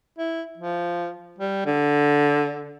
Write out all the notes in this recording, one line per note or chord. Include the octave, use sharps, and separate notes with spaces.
E4
F3
G3
D3